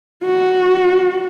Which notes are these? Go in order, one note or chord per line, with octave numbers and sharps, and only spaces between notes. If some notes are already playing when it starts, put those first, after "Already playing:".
F#4